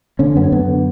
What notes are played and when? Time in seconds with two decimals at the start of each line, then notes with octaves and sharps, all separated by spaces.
0.19 D3 C#4
0.36 F#2 B3
0.44 C#4
0.52 F#2 B3
0.68 D3